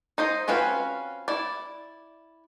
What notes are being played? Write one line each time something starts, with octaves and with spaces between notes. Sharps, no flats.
D#4 C5 D#5
C4 C#4 F4 F#4 B4
E4 D5